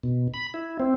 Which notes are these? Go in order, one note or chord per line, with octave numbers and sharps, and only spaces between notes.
B2
B5
E4
C4